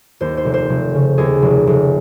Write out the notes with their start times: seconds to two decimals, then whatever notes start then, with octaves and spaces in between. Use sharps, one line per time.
0.21 D#2 C5
0.37 C5
0.45 F1
0.54 C5
0.70 F1
0.94 C#3
1.18 D#2 G#4
1.42 F1
1.67 F1